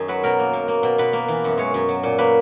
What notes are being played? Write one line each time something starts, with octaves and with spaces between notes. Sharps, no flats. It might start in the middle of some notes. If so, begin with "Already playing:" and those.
Already playing: F#2 D#3 G#4
F#3 B4
B2 A#4
A#3
B2
A#3
B2
B2 B4
A#3
E3
F#2
G#3 C#5
F#2
F#3
A#2
A#3 B4